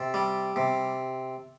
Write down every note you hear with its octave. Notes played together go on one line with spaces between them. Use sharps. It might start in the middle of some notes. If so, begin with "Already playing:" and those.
Already playing: C3 A4
G3
C3